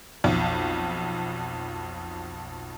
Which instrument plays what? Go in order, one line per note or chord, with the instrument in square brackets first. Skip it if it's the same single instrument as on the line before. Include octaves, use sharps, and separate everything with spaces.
[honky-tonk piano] B1 F2